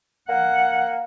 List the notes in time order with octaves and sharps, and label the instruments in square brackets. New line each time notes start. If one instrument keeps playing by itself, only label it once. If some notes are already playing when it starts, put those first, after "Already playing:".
[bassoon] A#3 [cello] F#5